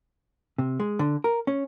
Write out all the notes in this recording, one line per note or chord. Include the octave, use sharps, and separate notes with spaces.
C3
G#3
D3
A#4
C#4